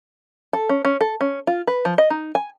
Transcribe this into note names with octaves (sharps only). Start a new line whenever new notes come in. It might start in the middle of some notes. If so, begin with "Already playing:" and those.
A4
C#4
C#4
A4
C#4
F4
B4
F3
D#5
D#4
G#5